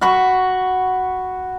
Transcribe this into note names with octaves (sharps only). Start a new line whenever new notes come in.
F#4 F#5 B5 C#6